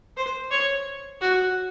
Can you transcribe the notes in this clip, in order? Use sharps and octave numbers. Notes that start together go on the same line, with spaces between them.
C5
C#5
F#4